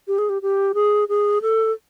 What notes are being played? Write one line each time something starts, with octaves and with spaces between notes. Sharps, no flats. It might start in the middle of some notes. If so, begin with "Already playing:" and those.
G4
G#4
G4
G4
G#4
G#4
A4